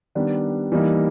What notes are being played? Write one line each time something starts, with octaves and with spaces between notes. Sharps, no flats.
D#3 G3 B3 D4
E3 G3 A#3 D#4